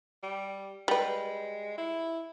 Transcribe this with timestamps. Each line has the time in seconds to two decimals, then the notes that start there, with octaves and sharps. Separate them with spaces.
0.23 G3
0.88 G3 G#3 B4
1.78 E4